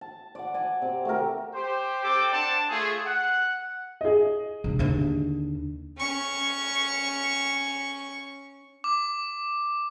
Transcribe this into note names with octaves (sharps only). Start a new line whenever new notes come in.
A5
D5 F#5
D5 G#5
C3
A3 F#4 G4 A#4
G4 C5
C4 A4 G5 D6
D4 C5 D5 F#5 A5
A3 F4 G#4
F#5
G#4 D#5
E1
D#2 D3
C#4 C#6
D6